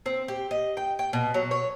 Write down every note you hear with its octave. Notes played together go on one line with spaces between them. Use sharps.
C4
G4
D#5
G5
G5
B2
F#3
C#5